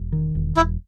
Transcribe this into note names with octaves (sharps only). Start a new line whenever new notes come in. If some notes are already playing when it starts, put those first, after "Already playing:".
Already playing: E1
D#3
E1
E1 E4